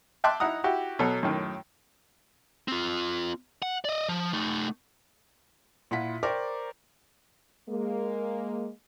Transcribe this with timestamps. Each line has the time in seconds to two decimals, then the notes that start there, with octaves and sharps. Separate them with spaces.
0.24 E5 G5 A5 C6 D6 F#6
0.40 D#4 E4 F#5 A#5 D#6
0.64 E4 F#4 G4
0.99 B2 F#3 A4
1.23 F#2 A2 D#3
2.68 C4 F4
3.62 F#5
3.85 D5 D#5
4.08 F3
4.33 A3 D#4
5.91 A#2 E4 F4 F#5 B6
6.23 A#4 C5 D5 G5 C#6 D6
7.69 G#3 A#3